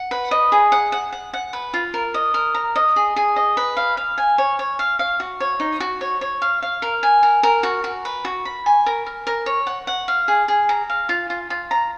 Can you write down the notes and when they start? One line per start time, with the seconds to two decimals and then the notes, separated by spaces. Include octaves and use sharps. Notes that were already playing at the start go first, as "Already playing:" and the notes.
Already playing: F#5
0.11 B4
0.31 D#5
0.52 G#4
0.72 F#5
0.92 F#5
1.12 F#5
1.33 F#5
1.53 B4
1.74 F4
1.94 A#4
2.14 D#5
2.34 A#4
2.55 A#5
2.76 D#5
2.96 G#4
3.16 G#4
3.36 D#5
3.57 B4
3.77 F5
3.97 F5
4.18 G#5
4.38 C#5
4.59 C#5
4.79 F5
4.99 F5
5.20 F#4
5.40 C#5
5.60 D#4
5.80 F#4
6.01 C#5
6.21 C#5
6.42 F5
6.62 F5
6.82 A#4
7.03 G#5
7.23 A#4
7.43 A#4
7.63 F#4
7.84 F#4
8.05 B4
8.25 F#4
8.45 B5
8.66 G#5
8.86 A#4
9.06 A#4
9.27 A#4
9.46 C#5
9.67 F#5
9.87 F#5
10.08 F5
10.28 G#4
10.48 G#4
10.69 A#5
10.90 F5
11.09 F4
11.30 F4
11.50 F4
11.71 A#5